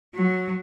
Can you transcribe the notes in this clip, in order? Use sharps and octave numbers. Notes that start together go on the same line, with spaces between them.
F#3